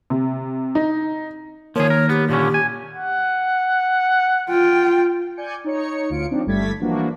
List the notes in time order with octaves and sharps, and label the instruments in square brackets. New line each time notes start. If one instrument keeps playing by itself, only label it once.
[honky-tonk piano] C3
D#4
[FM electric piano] D#3 A#3 [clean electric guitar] F3 G#4 [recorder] C#5
[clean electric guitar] A#4
[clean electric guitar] B3 [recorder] G4
[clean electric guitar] A#2 D3 C#4 [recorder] G4
[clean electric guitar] G#5
[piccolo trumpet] F#5
[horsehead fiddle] F4 G5
[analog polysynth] D5 G#5 G6 C#7
D#4 C#5 C#7
D2 F4 C#7 D7
F3 C4 D4 D#4
G1 G3 A3 G#6 A6 B6
E3 F3 A#3 D4 F#4